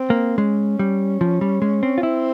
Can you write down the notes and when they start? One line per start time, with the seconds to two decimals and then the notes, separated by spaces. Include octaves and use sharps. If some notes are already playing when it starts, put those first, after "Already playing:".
Already playing: C4
0.10 A#3
0.37 G#3 C#4
0.79 G3
1.21 F3
1.41 G3
1.62 G#3
1.83 C4
1.98 F4
2.03 C4 E4